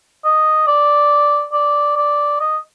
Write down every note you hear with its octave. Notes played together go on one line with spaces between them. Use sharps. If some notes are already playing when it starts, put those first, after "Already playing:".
D#5
D5
D5
D5
D#5